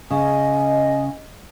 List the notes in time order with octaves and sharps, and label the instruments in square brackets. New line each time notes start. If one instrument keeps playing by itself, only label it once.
[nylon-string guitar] C#3 [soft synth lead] D#5 [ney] G#5